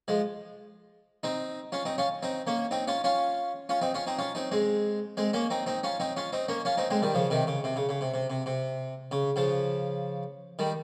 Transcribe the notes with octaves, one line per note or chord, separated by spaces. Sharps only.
F3 G#3
C4 D#4
C#4 F4
C4 D#4
C#4 F4
C4 D#4
A#3 C#4
C4 D#4
C#4 F4
C#4 F4
C#4 F4
C4 D#4
C#4 F4
C4 D#4
C#4 F4
C4 D#4
G#3 C4
G#3 C4
A#3 C#4
C4 D#4
C4 D#4
C#4 F4
C4 D#4
C#4 F4
C4 D#4
A#3 C#4
C#4 F4
C4 D#4
G#3 C4
D#3 G3
C#3 F3
C3 D#3
C#3
C3
C#3
C#3
C3
C3
C3
C3
C#3
C#3 F3
D#3 G3